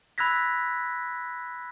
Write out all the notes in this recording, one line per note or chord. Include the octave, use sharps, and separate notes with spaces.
B5 E6 F#6 G#6 A#6 B6